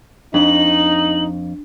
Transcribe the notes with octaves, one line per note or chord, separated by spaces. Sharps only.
F2 D4 D#4 F#7